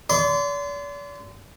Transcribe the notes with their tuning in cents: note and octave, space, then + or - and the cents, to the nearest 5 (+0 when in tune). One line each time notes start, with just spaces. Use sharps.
D5 -40 C6 -30